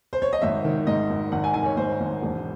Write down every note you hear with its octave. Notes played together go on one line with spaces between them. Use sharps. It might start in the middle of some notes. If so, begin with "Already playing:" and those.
C5
C#5
D#5
G#1 E5
D#3
G#2 D#5
G#1
G#1 F#5
G#5
D#3 G#5
C#5
G#1 C5
G#1
E1